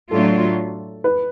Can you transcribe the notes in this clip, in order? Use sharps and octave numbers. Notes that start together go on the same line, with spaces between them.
A2 F#3 A3 D4 F4 A4
B4